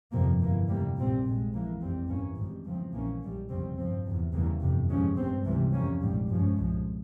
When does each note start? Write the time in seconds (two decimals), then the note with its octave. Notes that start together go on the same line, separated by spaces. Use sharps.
0.12 G1 F2 C3 F3 A#3
0.41 G1 G2 E3 A#3
0.68 F2 C3 G3 A#3
0.96 A#1 A#2 G3 C4
1.24 A#1 A#2 G#3
1.53 F2 E3 A#3
1.81 F2 E3 G3 C4
2.08 G2 E3 A#3 C#4
2.36 G#1 G#2 G3
2.65 E2 C#3 F3 C4
2.93 A#1 G#2 E3 A#3 C#4
3.21 A#1 G#2 G3
3.49 F1 E2 C#3 G3 C4
3.76 G2 F3 C4
4.05 E2 C3 E3
4.33 E2 C#3 E3 G3 A#3
4.61 G1 F2 C3
4.89 G#1 G2 F3 G#3 C#4
5.16 G#1 G2 G3 C4
5.45 C#2 C3 E3 G3
5.73 F2 C3 G3 A#3 C#4
6.00 A#1 G#2 G3
6.29 G2 F3 G#3 C#4
6.57 C2 A#2 F3 G#3